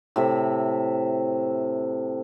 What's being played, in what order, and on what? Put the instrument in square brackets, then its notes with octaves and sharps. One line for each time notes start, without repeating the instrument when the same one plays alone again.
[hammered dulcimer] A2 C3 E5